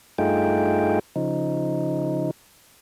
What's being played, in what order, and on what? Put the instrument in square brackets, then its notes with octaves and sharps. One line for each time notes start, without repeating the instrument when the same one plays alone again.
[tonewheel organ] G2 A3 D#4 F4 G#4 G5
C#3 F3 D#4